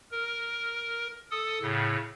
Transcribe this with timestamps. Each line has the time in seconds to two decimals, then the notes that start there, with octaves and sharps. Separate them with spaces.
0.11 A#4
1.31 A4 D#6
1.61 A2 C#3